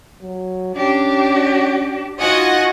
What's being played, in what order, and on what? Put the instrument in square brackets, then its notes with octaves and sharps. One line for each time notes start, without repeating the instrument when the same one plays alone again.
[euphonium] F#3
[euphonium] C#4 [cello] D4 G4
[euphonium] D#4 [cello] F4 F#4 [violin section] D#5 F#5 G#5